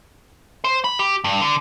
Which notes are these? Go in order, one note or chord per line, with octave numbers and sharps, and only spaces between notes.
C5
B5
G4
G2
D3